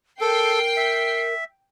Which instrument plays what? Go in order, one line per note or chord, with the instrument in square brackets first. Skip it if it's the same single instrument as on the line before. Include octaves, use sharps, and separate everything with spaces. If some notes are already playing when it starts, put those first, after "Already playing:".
[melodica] A4 [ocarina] A#4 [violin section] G5 C7
[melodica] E5